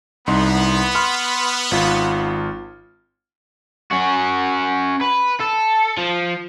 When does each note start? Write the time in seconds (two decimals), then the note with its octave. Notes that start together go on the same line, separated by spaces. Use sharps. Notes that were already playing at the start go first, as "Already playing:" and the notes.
0.27 C2 B3 D#4 C6
0.95 B5 C6 F6
1.71 G#1 F4
3.91 C#4 F#4
5.01 B4
5.40 A4
5.97 F3